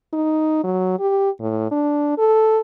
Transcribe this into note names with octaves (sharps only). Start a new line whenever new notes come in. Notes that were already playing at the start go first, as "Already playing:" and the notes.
D#4
F#3
G4
A2
D4
A4